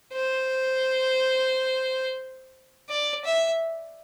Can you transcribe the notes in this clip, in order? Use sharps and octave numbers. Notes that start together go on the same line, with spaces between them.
C5
D5
E5